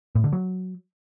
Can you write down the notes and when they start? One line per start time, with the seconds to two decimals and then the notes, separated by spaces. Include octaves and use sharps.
0.15 A2
0.24 D3
0.33 F#3